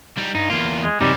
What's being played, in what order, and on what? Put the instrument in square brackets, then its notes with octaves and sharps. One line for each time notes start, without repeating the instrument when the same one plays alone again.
[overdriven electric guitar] G3 D#4
[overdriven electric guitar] G2 [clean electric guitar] D#4
[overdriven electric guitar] E2 A#3 [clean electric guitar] F4
[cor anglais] G#3
[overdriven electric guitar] F#2 E3 [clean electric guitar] C3 D#4 [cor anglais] G3